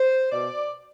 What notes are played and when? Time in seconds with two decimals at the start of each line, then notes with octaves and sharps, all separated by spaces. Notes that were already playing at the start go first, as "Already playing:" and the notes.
Already playing: C5
0.31 B2 D5